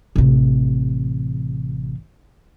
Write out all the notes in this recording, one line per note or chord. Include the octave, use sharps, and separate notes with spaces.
A1 C3